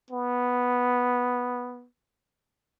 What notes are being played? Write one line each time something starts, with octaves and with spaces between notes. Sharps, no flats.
B3